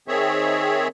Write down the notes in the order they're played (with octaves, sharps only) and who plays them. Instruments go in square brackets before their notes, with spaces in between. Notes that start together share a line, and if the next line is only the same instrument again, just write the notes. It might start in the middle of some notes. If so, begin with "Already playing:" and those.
[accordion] D#3 C4 G#4 C#5 E5